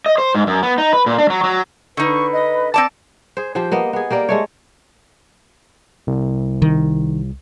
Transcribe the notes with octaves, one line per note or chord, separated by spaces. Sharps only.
D#5
C5
G#2
F#2
B3
D#4
B4
A#2
D4
F#3
F#3
D3 D#4 B4 C#6
D#5
C4 D5 A5 D6
G#4 C5
F3 G4 C5
A#3 B3 D#5
B3 G#4
A#3 G4 A#4 D5
G#3 A3 C#5
C2
D#3